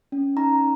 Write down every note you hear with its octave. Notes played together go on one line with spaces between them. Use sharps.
C#4
D#4 A#5